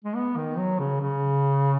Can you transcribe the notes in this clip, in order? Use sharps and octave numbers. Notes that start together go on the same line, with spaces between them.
G#3
B3
D#3
F#3
C#3
C#3